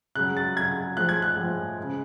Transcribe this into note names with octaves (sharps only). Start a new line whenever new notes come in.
C#3 F#3 F#6
A6
C#3 F#3 G#6
A2 F3 G#3 F#6
G#6
F#6
A2 F3 G#3
C#3 G#3